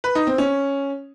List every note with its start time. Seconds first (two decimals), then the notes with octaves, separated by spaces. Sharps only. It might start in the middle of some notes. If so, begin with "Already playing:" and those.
0.04 B4
0.15 D#4
0.27 C4
0.38 C#4